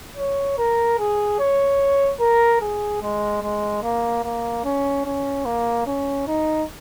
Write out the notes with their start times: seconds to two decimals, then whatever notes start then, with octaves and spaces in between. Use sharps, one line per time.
0.17 C#5
0.58 A#4
0.99 G#4
1.40 C#5
2.20 A#4
2.61 G#4
3.02 G#3
3.42 G#3
3.83 A#3
4.24 A#3
4.64 C#4
5.06 C#4
5.45 A#3
5.86 C#4
6.27 D#4